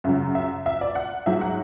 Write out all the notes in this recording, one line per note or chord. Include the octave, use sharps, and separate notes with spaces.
F#2 C#3 F#3 E5
E5
E5
D5
F#5
G#2 F#3 E5
F#5